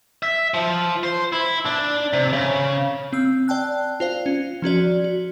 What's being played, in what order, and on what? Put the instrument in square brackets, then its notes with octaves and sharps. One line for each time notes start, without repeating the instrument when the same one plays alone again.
[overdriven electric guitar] E5
F3
C5
E4
D4
C3
C#3
[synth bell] C4 E6
D5 G5 A5 F#6
F4 C5 F5
C#4
F3 C#4 F#4 D5
F#4